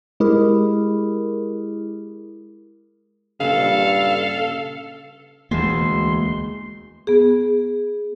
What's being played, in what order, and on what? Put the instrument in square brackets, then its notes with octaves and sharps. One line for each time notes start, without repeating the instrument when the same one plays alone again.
[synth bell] G#3 E4 G4 G#4 A#4
[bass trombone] G2 [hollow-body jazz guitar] A#2 C#3 [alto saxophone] A4 [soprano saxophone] F5
[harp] E1 E7 [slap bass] D2 G#3 A#3 [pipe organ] C6
[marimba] B3 G#4